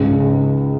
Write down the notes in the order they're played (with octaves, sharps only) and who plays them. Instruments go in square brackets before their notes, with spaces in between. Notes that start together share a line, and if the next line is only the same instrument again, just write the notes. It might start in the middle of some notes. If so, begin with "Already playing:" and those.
Already playing: [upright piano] C#2 C#3 G#3 [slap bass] G#2